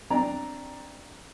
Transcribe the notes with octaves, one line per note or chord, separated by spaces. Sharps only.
C4 D4 D5 A#5